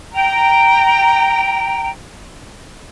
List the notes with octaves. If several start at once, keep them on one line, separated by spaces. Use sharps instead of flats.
G5 A#5